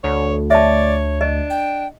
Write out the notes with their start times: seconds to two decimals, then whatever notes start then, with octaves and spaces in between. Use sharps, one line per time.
0.04 D2 C#5
0.50 C#5 D5 E5 A5
1.21 D4 D#5
1.50 G5